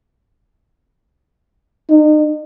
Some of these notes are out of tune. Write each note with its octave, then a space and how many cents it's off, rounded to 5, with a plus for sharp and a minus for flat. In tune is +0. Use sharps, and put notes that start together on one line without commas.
D#4 -35